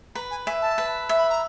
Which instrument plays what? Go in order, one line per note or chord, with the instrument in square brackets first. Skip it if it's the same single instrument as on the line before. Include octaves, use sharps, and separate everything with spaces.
[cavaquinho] B4 [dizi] A#5
[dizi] G#5
[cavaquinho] E5 [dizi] G#5
[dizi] A5
[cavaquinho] B4
E5
[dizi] B5
A#5